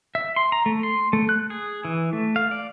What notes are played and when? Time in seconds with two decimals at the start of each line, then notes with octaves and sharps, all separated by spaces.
0.15 E5
0.36 C6
0.52 A#5
0.66 A3
0.83 C6
1.13 A3
1.29 F#6
1.50 G#4
1.85 E3
2.13 A3
2.36 F5
2.51 D5